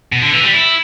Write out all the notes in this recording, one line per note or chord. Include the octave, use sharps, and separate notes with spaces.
B2
D3
E3
G3
E4